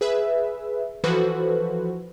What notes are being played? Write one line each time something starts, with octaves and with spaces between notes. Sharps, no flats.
G#4 B4 E5
E3 F3 F#4 A4 B4 C5